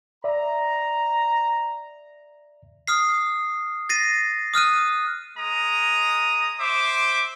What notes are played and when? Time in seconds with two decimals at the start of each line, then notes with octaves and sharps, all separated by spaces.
0.24 D5 E5 A#5
2.87 D#6 F6 C7
3.89 A6 A#6 C7 D#7
4.54 D#6 F6 F#6 D#7
5.38 G#3 A#5 D#6
6.59 C5 E5 D6